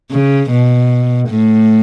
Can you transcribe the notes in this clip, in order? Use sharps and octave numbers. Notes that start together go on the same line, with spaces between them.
C#3
B2
A2